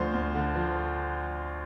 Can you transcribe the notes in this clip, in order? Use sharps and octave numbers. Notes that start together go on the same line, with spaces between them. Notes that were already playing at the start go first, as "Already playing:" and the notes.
Already playing: D2 F3 C5
D2
D3
F3